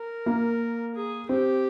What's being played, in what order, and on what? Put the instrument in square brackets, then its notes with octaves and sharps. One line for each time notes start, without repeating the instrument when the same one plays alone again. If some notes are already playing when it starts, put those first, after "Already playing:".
Already playing: [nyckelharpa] A#4
[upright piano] A#3
[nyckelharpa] G#4
[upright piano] C4 [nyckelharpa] G4